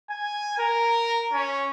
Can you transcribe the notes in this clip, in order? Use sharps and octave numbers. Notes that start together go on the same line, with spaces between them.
G#5
A#4
C#4